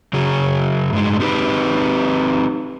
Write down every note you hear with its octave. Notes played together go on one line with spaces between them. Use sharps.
C#3 F#3 G#4
G2 G#3
C4 D#4 G4 B4